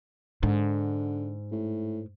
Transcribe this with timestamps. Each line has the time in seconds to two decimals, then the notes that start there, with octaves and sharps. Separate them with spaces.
0.43 G#2 D3
1.52 A2